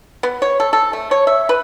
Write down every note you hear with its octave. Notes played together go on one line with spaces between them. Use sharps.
B3
C#5
A4
A4
A3
C#5
E5
B4